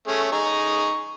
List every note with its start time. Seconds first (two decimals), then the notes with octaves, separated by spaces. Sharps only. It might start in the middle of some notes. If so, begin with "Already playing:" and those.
0.08 A3 C#4 G#4
0.32 D#4 G#4 C#6